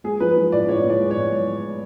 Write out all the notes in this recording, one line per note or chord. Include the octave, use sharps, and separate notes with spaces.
G#3 G#4
F3 B4
F3
A2 D5
A2 C#5
A2
D5
G#3
C#5
A2